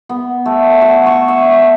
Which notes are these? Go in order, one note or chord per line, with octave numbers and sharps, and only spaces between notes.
B3
A3
F#4
C#6
E5